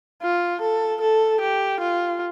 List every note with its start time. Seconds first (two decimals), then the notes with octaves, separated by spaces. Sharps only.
0.22 F4
0.61 A4
1.01 A4
1.41 G4
1.80 F4